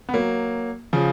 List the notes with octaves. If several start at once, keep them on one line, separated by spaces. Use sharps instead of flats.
B3
F#3 A#3
C#3 F3